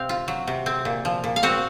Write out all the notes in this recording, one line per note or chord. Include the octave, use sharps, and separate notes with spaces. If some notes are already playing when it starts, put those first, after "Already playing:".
Already playing: C3 C4 F5
F4
F#3
C3
C4
A#2
F3
A#2
F5
C4 F#4 F#5